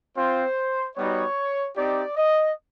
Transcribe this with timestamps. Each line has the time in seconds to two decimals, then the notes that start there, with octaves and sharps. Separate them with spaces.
0.16 C4 F4 C5
0.97 G3 B3 D#4 F#4 C#5
1.76 C4 D#4 G4 D5
2.16 D#5